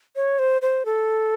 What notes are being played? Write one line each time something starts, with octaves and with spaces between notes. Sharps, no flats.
C#5
C5
C5
A4